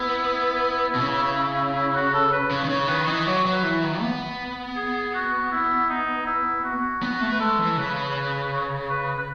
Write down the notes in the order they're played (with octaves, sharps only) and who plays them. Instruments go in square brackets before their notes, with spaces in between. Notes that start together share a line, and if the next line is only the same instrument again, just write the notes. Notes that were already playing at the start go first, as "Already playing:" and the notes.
Already playing: [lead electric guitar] B3 [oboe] E4
[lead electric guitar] B2
C#3
[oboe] E4
F#4
A4
B4
[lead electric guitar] C#3
D#3
[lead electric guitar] C#3 [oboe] C#5
[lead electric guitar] D#3 [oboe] B4
[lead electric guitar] E3 [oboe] D#5
[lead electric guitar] F#3 [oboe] C#5
[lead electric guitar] F#3
[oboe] B4
[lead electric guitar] E3
D#3
B3
[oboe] G#4
F#4
E4
D#4
E4
F#4
[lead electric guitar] B3 [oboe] F#4
[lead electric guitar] A3
[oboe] B4
[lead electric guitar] G#3 [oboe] A4
[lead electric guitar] E3
[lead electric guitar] C#3 [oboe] B4
[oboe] C#5
B4
B4